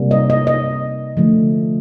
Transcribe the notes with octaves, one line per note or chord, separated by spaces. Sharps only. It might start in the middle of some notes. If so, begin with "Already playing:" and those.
Already playing: C3 G3 A#3
D#5
D#5
D#5
D3 F3 A3